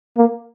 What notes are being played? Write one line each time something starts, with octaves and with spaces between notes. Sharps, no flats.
A#3